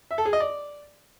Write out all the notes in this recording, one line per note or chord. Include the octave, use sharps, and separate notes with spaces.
E5
A4
G#4
D#5
D5